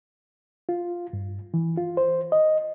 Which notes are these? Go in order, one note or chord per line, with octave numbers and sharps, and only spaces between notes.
F4
G2
E3
F4
C5
D#5